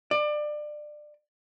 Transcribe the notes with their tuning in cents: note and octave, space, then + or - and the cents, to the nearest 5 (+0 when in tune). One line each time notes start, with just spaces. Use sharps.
D5 +25